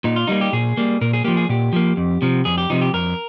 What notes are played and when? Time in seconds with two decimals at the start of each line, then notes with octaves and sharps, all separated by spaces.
0.04 A#2 D#4
0.16 F4
0.27 G3 A#3 D#4
0.41 G4
0.53 A#2 G#4
0.77 G3 A#3
1.01 A#2 A#4
1.13 G#4
1.24 F3 A#3 G4
1.37 G#4
1.49 A#2 G4
1.73 F3 A#3
1.97 F2
2.22 C3 F3
2.45 F2 G#4
2.58 G4
2.70 C3 F3 D#4
2.81 G4
2.93 F2 A#4